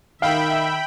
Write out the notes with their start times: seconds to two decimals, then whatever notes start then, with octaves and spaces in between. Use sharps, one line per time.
0.22 D#3 E5 F5 G5 B5